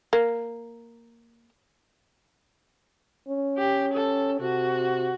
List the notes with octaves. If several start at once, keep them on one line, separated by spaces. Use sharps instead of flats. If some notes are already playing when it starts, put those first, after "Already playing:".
A#3 A#4
C#4
G4
A4
C3 F#4